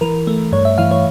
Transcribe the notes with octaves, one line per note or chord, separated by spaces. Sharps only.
E3 A#4
A3
G2 C#5
E5
E3 F5
C#5